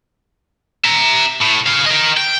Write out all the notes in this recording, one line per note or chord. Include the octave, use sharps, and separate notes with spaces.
E5 A#5
A2
G#4 F5
A#4 D#5
G5